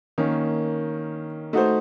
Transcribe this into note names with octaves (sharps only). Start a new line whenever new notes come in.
D#3 A#3 C#4
A3 D#4 F#4 C5